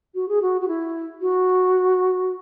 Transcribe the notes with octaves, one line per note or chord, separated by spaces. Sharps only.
F#4
G#4
F#4
F#4
E4
F#4